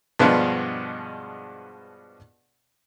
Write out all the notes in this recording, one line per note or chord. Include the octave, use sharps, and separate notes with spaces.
G2 B2 F3 G#3 B3 D4